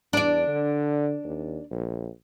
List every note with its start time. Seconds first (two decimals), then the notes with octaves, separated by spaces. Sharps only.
0.13 E2 D4 D5
0.47 D3
1.24 D#2
1.71 A#1